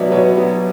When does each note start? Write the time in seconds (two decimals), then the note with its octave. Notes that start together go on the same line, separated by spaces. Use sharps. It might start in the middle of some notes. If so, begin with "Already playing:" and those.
Already playing: B2 F#3 B3 D5 E5
0.11 B2 B4 C#5
0.37 F#3 B3